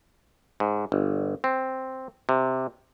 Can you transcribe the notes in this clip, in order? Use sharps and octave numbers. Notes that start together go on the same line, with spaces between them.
G#2
G1
C4
C3